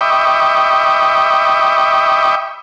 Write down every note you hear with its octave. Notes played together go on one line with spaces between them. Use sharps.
D#5 E5 G5 B5 C#6 D6